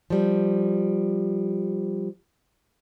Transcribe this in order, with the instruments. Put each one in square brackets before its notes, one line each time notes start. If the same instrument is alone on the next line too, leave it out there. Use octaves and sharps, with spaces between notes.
[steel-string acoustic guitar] F3 G3